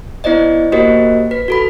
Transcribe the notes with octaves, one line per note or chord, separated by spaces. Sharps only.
B3 E4 C5 D5 D#5
A#3 F#4 G4 A#4 C5 D#5
B4 B6
F#4 A4 B5